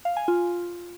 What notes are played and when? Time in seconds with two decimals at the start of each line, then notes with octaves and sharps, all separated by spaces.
0.05 F5
0.17 G#5
0.28 F4